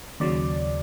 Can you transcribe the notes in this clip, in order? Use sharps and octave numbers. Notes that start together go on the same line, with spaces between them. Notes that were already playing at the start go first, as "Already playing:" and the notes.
D#2 C#3 F#3 D5